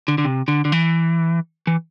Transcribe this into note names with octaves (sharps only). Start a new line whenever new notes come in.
D3
D3
C3
D3
D3
E3
E3